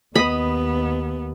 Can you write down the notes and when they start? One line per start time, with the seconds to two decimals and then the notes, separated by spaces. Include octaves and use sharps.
0.15 D#2 B3 D#5 B5